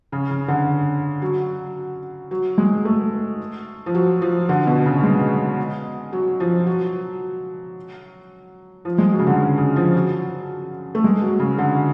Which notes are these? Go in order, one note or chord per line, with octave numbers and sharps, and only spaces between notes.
C#3
C#3
D3
F#3
F#3
G#3
A3
F3
F#3
F3
D3
B2
C#3
G#3
F#3
F3
F#3
F3
G#3
F#3
C#3
D3
C#3
C#3
F3
F#3
A3
G#3
F#3
C#3
D3